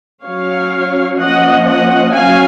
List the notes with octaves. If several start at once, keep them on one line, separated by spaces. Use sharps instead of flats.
F#3 C#4 C#5 F5
F3 A#3 C#4 D#5 F#5
D#5 F#5
F#3 C#4 F5 G#5